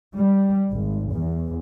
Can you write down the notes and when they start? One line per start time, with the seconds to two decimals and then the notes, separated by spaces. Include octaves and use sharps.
0.17 G3
0.71 G#1
1.11 E2